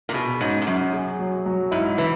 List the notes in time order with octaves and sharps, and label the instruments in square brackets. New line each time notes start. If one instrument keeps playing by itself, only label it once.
[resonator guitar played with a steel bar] A#2
[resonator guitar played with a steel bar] B2 [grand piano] G#4
[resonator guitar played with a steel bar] G#2 [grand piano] C#4
[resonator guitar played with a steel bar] G#2
[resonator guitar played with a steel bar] F#2 [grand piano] F#3
[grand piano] G#4
F#3
F#3
[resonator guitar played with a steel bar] G#2 [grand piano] E4
[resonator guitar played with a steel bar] E3 [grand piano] B4